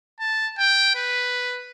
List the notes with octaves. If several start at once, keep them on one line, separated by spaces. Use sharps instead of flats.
A5
G5
B4